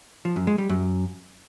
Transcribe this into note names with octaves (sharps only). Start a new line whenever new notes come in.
F3
F#2
G#3
G3
F#2